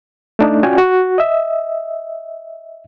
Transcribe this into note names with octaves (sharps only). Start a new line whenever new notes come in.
A3 D4 D#4
C#4 F4 F#4 D5 G5 G#5
F#4
D#5 E5